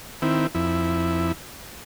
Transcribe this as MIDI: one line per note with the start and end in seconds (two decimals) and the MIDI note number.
0.22 0.47 51
0.22 0.47 60
0.22 0.47 64
0.55 1.32 41
0.55 1.32 64